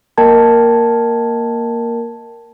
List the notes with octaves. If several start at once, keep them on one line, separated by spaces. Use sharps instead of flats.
A#3 A#4 D#5 G5 A5 G#6